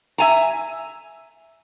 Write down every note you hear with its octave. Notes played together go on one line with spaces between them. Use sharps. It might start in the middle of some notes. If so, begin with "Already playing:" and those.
E5 G#5 A#5